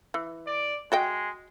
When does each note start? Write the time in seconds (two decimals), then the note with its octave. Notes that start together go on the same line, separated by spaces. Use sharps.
0.14 E3
0.47 D5
0.92 G#3 F#4 D#5 G5